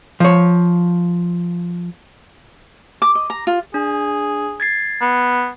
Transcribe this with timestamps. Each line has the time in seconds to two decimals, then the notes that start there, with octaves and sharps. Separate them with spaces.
0.20 F3 C#5
3.02 D6
3.15 D#5
3.30 A#5
3.47 F4
3.74 D4 G#4
4.60 G#6 A6 C7
5.01 B3